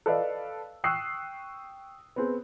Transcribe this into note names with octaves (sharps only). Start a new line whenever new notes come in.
A4 B4 D5 D#5 F5
G5 C#6 D#6 E6 F#6 C7
B3 C4 G#4